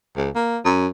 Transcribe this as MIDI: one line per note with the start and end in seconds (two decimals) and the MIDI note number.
0.17 0.30 37
0.35 0.59 58
0.65 0.87 42